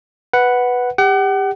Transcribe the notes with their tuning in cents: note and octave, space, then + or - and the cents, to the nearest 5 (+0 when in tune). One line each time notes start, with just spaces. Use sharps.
B4 +0 F#5 +0
G4 +30 F#5 +40